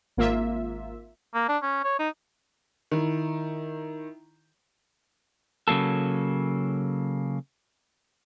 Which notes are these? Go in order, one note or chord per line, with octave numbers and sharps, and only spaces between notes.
G#1 A#3 F4 E5
A#3
D4
C#4
C#5
D#4
D#3 E4
C#3 F#3 A#3 A4